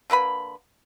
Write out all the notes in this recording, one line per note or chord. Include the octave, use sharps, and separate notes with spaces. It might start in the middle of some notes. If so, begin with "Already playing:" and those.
D3 A#3 B4 B5